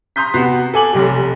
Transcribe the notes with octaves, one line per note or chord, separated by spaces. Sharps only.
A#5 C6 D#6 G6 B6
C3 B3 F#4 C7
A4 G#5 D6 F#7
F1 B1 G4